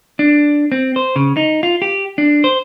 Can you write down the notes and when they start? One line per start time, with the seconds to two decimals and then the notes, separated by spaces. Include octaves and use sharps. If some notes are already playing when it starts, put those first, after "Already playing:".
0.19 D4
0.72 C4
0.96 C5
1.16 C#3
1.37 D#4
1.63 F4
1.82 G4
2.18 D4
2.44 C5